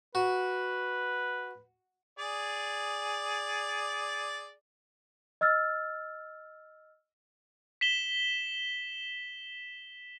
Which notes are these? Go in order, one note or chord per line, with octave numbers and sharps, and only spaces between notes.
F#4 B4
G#4 D5
D#5 E6 F6 A6
B6 E7 G7